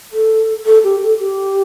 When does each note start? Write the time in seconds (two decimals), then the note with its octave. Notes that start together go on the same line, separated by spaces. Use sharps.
0.13 A4
0.66 A4
0.84 G4
1.02 A4
1.19 G4